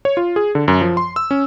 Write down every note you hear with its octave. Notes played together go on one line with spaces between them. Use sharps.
C#5
F4
G#4
D3
F#2
F3
C6
E6
C#4